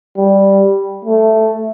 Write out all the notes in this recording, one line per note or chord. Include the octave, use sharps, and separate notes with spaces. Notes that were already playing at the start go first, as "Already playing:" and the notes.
G3
A3